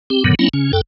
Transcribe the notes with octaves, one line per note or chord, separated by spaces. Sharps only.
C4 G4
G2 A#2 D3 D#3 F#3 B3
F#3 A#3 C4 C#4 E4
C#3 C#4
F#2 A4 G5